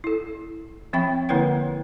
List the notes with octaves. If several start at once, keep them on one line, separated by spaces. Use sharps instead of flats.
E4 A4
F3 C4 E5 G5 B5 C#6
D3 A#3 E4 B4 C#5 G5